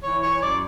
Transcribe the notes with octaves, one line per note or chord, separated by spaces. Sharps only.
E3 C#5
E3 C#5
F#2 D5